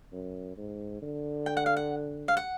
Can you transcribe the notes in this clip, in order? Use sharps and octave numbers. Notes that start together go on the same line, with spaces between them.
F#2
G#2
D3
G5
F#5
F5
F#5
F5
F#5